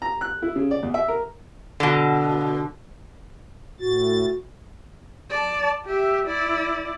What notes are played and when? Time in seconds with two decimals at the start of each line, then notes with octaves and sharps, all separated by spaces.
0.02 A#5
0.21 F#6
0.42 E4
0.56 C#3
0.71 D5
0.83 E2
0.94 E5
1.08 A#4
1.80 B2 D3
3.80 A2 F#4 A6
5.30 D5 A5
5.86 G4 E5
6.27 E4 D5